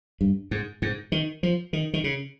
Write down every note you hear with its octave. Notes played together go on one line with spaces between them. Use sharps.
G2
G#2
G#2
D#3
F3
D#3
D#3
C#3